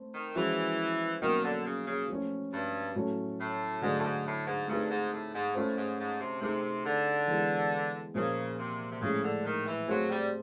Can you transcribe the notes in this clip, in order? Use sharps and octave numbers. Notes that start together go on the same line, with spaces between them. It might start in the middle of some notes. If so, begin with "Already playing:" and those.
Already playing: A3 C4
D#3
E3 F3 G#3 C#4 F#4
B2 D#3 F#3 A#3 C#4 F#4
D3
C#3
C#3
F3 A3 C#4
G2
A2 F#3 A3 C#4
A2
G#2 D3 F#3 A3 D4
A2
G#2
A2
G#2
G2 A3 C4 D#4 G#4
G#2
A2
G#2
A2 A3 C#4 F4 A4 C5
G#2
G#2
C3
C3 A3 C4 D#4 G#4
D3
E3 G#3 B3
A#2 C#3 F3 A#3
C3
C3
A2 C#3 F3 G#3
D3
D#3
E3
F#3 A3 C4 F4 G#4
G3